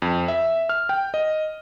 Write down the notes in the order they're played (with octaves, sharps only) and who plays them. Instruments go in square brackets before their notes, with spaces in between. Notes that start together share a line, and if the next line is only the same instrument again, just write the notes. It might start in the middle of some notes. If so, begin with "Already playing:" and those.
[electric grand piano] F2
E5
F6
G5
D#5